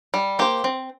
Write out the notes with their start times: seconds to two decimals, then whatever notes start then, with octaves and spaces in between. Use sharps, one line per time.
0.14 G3
0.39 A#3 G4 C5
0.64 C4